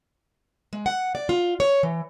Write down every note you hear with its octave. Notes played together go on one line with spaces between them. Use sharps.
G#3
F#5
D5
F4
C#5
E3